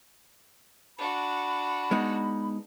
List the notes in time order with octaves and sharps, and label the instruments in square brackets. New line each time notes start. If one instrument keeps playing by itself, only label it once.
[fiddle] D4 F#4 [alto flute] B5
[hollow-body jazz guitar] G#3 B3 D#4